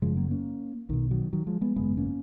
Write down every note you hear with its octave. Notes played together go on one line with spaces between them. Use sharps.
F#1 F#2 C#3 F3 G#3
F#3 A#3
A#3 C#4
B1 B2 D#3
D#3 F#3
D#3 F#3
F3 G#3
G#3 B3
G#1 F#2 C#3 G#3 B3
A#3 C#4